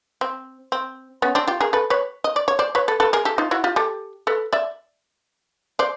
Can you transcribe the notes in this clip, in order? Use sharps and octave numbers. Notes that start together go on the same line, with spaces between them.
C4
C4
B3 C#4
C4 D4
F4 G4
G#4 A#4
A4 B4
B4 C#5
D#5
D5
C#5
C5 D5
B4 C#5
A4 B4
A4 B4
G#4 A#4
G4 A4
D#4 F4
E4 F#4
F4 G4
G4 A4
A4 B4
D5 E5
C5 D5